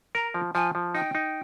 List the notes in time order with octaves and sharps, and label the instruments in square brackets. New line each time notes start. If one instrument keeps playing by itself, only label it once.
[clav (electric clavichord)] A#4 [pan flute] A#5
[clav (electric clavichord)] F3
[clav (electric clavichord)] F3 [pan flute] G#5
[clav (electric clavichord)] F3
[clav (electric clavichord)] D#4 [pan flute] G5
[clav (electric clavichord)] D#4